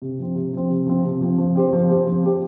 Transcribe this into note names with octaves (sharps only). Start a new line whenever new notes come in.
C3
F3 C4
C3
F3 C4
C3
F3 C4
C3
F3 C4
F3
C4 G4 C5
F3
C4 G4 C5
F3
C4 G4 C5